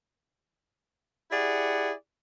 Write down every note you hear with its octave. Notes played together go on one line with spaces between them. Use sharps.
E4 G4 G#4 D5 F#5